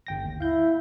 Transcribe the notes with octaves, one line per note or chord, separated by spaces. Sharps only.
G1 G5 A#6
D#2
E4 F5 G6